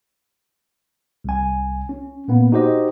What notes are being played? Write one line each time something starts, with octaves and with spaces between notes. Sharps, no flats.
C2 G#5
C#4
A#2 A#3 B3
D#4 F#4 G4 C5 D#5